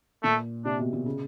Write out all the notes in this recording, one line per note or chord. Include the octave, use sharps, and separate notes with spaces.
A#2 A3
C3 D4
B2
A#2
C#3